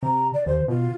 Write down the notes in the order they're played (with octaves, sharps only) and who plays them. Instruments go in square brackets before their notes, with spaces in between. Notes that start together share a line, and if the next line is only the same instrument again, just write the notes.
[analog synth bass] C3 [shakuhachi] A#5
[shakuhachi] D5
[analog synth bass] D#2 [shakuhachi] C5
[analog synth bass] B2 [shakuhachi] F4